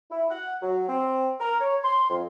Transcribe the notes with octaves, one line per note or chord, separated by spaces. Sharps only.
E4
F#5
F#3
C4
A#4
C#5
C6
F2